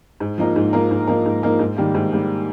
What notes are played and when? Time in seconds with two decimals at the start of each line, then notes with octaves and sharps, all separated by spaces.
0.20 G#2
0.38 F3 A#3 D#4 A#4
0.56 G#2
0.73 F3 A#3 D#4 A#4
0.91 G#2
1.08 F3 A#3 D#4 A#4
1.26 G#2
1.43 F3 A#3 D#4 A#4
1.59 G#2
1.77 D#3 G3 A#3
1.95 G#2
2.12 D#3 G3 A#3